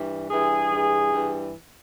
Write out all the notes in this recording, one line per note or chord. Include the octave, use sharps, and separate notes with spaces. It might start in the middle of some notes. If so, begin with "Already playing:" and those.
Already playing: G2 E3
G2 E3 G#4
G2 E3
G2 E3